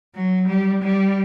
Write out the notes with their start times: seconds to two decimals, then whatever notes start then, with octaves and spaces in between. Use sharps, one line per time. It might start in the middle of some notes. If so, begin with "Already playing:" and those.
0.14 F#3
0.47 G3
0.82 G3